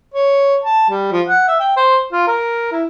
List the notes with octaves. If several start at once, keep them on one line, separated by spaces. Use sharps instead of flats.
C#5
A5
G3
F3
F#5
E5
G5
C5
F4
A#4
E4